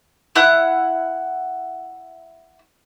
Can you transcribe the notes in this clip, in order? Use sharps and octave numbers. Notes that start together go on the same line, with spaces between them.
E4 F#5 F#6